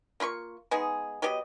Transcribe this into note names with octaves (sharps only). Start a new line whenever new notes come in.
A#3 F4 B5 C#6
G#3 B3 D#4 G#4
F#3 B3 G4 D#5